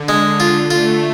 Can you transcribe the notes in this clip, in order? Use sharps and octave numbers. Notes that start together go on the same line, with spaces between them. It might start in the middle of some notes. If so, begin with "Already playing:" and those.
Already playing: D3
G#3
F4
A3 F4